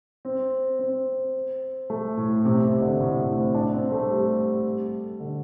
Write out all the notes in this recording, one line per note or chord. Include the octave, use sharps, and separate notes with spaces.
C4
C4
A3
A2
C3
C3
D3
A2
A2
C4
D4
C4
A3
G3
D3